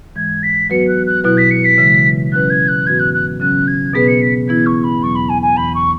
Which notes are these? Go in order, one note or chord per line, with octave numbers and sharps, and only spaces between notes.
G#2 E3 G#3 G#6
B6
F#3 B3 F#4 B4 C#7
F#6
F#6
B2 F#3 E4 B4 F#6
B6
C#7
B6
C#3 E3 G#3
F#3 C#4 E4 B4 F#6
G#6
F#6
G#2 E3 B3 F#4 B4 G#6
F#6
F#6
C#3 F#3 C#4 F#6
G#6
B2 B3 G#4 B4 B6
C#7
B6
E3 B3 E4 G#6
C#6
B5
E2 B2 F#3 B3 C#6
B5
G#5
G#5
E2 E3 B3 B5
C#6